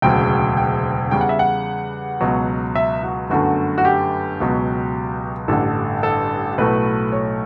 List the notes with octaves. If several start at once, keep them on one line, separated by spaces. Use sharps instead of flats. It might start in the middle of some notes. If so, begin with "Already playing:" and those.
E1 D2 C#3 F#3 G5
G5
E2 C#3 G3 G5
F#5
E5
F#5
C#2 B2 F#3
E5
F#4
G1 F#2 D3 A3 F#4
F#4
G4
C#2 B2 F#3
A1 G2 D3 G3 A4
A4
B1 A2 F#3 A3 B4
C#5